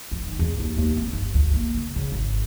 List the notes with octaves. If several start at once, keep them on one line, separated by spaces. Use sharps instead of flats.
F3
D#3
E2
D#2
D#2
C4
G1
D2
A#3
D3
C#3
G#1